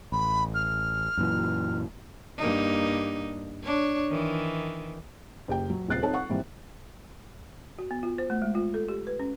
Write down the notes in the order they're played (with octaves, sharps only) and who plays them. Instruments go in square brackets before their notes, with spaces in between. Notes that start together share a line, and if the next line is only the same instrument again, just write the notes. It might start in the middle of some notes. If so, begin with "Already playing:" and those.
[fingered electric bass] A1 [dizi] B5
[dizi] F6
[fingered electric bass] F#2 A#2 E3
[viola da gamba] G2 A#3 D#4
D4 C#5
D#3 E3
[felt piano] F#1 G4 G5
F#3
D#1 C#2 C4 F#6 A6 C7
C4 D#4 A4 C#5 A5
F#5 C#6
G#1 E3 G3 C4
[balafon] F#4
B3
F4
C5
A3
G#3
F4
A4
G4
B4
C#4